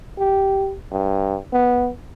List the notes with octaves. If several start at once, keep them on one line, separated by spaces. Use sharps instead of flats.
G4
G2
B3